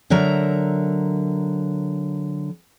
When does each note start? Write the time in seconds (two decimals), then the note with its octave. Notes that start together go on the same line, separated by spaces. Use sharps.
0.10 D3 F#3 A#4 E5 A#5